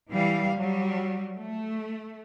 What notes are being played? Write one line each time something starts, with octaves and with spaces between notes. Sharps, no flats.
E3 G3 F5
F#3 G3
A3